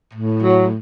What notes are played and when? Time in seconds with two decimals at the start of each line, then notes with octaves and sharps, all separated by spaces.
0.14 A2
0.43 F#3